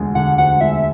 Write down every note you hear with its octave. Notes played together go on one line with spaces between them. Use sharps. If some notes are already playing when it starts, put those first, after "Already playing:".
Already playing: E1 D2 D3 G#3
D3 F#5
D2 F#5
G#3 E5